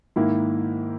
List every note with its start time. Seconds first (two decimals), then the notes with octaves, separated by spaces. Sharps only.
0.16 G#2 D#3 A#3 E4